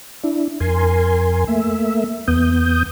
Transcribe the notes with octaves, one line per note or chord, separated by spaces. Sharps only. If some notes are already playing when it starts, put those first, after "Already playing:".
D4 E4
F2 A#4 G#5 C6
A3 A#3 E5
E2 B3 D#6 G6